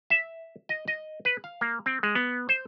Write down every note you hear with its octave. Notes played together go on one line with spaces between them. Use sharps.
E5
D#5
D#5
B4
F5
A#3
C4
G#3
B3
C5